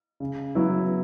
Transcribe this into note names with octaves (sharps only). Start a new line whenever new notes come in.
C#3
F#3 B3 E4